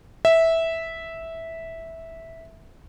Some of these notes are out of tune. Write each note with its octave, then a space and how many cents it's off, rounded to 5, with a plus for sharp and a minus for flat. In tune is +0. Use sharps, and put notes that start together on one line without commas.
E5 -10